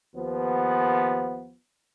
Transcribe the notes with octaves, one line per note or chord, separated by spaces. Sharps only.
D#2 F3 B3